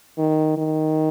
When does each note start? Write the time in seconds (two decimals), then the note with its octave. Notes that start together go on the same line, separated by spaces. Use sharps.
0.18 D#3
0.57 D#3